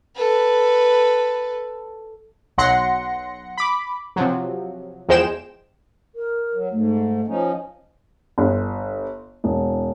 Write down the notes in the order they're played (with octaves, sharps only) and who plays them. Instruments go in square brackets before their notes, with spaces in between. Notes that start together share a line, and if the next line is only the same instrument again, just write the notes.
[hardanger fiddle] A4 B4
[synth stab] B1 F#3 F#5 C6 A#6 C#7
B5 D6
C3 F3 F#3
E2 F3 G#3 C5 G5 E7
[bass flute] A#4
[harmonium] F#3
[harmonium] G#2 [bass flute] A3
[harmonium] F3 C#4 D#4
[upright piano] G1
E1